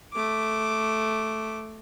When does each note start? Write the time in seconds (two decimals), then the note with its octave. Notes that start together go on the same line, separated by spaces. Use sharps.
0.13 A3 D6